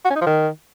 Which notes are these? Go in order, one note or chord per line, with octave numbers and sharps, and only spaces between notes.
F#4
C#4
D#4
F3
D#3